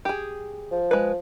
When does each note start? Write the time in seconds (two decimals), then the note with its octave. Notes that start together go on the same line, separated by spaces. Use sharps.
0.05 G4 G#4
0.72 F3
0.91 G#3 B4